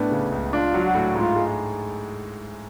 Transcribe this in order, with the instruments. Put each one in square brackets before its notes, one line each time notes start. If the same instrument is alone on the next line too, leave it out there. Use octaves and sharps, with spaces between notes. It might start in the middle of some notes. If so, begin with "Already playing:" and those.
Already playing: [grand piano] A2 B3 [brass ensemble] D4
[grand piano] C#3
C#2
[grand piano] D4 [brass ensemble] F4
[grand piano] F#3
[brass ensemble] F#4
[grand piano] A2
[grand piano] G#2 [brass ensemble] F4
[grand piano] G#3